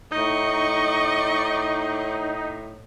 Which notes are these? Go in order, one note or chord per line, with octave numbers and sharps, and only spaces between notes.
A2 D#4 D#5 C#6